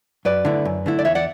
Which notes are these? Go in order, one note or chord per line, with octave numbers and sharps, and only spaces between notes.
F#2 B4 D5
D3 A3 E4
F#2
D3 A3 E4
D5
E2 C#5 E5
D5 F#5